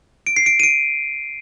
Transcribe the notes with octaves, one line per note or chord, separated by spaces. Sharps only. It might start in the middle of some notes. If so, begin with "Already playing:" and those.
D7
C7
D7
D#7
D7